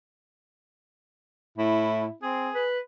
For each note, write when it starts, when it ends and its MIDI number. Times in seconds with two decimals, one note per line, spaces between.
1.58 2.05 45
1.58 2.14 64
2.22 2.49 60
2.22 2.64 68
2.54 2.79 71